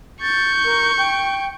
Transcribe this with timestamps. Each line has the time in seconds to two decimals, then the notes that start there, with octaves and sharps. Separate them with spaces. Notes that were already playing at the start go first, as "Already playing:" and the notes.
0.22 C#6 G6 A6
0.65 A#4
0.98 G5